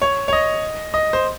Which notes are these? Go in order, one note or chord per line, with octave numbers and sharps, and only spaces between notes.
C#5
C#5
D#5
D#5
C5